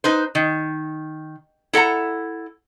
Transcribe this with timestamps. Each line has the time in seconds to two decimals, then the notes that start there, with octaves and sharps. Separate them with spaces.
0.04 D#4 B4 C5
0.35 D#3
1.73 E4 A4 F#5 A#5